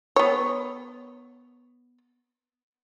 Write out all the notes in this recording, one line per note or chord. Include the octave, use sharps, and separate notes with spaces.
B3 C#5